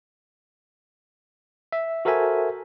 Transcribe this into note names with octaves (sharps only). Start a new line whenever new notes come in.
E5
F#4 A4 A#4 C5 E5 G#5